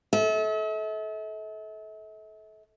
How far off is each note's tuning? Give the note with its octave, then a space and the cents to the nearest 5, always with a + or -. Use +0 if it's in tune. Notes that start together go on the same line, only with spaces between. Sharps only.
A4 -25 E5 -45